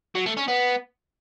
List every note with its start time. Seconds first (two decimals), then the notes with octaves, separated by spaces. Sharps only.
0.15 F#3
0.26 A3
0.37 C#4
0.48 B3